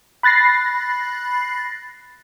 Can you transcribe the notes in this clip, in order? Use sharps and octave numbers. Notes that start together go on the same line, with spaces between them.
B5 F#6 A6 A#6 C7